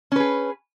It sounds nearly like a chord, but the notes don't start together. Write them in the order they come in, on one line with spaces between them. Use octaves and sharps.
C#4 B4 G#4